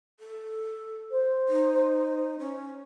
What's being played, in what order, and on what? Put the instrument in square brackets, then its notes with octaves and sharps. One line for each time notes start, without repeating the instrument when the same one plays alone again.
[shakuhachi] A4
[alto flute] C5
[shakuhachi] D#4
C#4